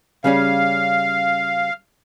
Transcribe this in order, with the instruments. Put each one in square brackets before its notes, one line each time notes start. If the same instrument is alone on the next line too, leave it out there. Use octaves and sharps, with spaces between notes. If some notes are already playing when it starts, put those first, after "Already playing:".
[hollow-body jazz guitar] C#3 G3 C#4 [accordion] F5